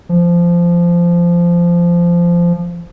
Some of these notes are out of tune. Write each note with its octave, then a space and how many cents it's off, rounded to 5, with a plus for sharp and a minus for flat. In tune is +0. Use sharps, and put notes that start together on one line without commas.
F3 -15